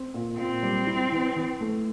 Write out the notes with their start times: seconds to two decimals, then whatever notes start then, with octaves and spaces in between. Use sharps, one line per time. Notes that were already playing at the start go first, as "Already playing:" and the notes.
Already playing: C4
0.14 A#2
0.38 A#2 C4
0.63 G3
0.87 E4
1.12 E3
1.36 E3
1.61 A3